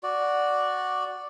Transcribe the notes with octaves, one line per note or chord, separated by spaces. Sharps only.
F#4 D5